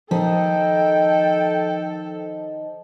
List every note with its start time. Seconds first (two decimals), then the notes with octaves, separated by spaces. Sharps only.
0.11 D#3 F3 A4 G5